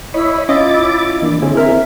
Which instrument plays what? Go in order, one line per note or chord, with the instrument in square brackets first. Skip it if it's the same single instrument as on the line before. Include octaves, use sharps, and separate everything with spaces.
[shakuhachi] E4 [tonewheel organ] C#5 D#5 B5
[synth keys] C#4 F4 D#5 [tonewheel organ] D6 A6
[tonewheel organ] E3 A#3 D4
[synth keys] D3 C#4 [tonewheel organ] C4 E4 G#4
[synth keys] A#4 [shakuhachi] E5